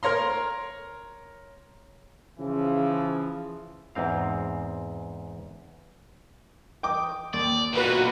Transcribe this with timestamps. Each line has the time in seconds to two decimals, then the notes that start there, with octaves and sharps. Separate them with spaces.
0.03 A#4 C#5 A#5 C6
2.38 C#3 E3 F3
3.95 E2 G#2 C4 F5
6.83 G5 D6 D#6
7.34 D#2 D5
7.73 B1 A#2 F#4 B4